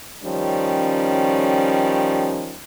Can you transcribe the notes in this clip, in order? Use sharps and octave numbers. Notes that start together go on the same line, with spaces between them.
D#3 F3 G3 C#4